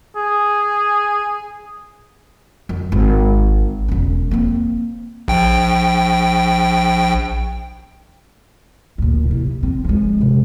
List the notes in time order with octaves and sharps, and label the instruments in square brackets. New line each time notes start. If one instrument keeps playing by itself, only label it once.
[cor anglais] G#4
[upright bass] F#2
G#1
E1 C#4
A#3 C4
[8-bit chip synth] A#1 G5
[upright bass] D2 A#2
C3 E4
C4
F3 G#3
F2 C3